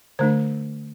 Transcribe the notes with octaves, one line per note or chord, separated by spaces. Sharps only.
D3 A3 D4 C5